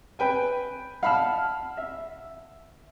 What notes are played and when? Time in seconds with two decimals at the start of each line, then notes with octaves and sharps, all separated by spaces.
0.19 B4 G5 G#5
1.03 F5 F#5 A5 B5 F6
1.77 E5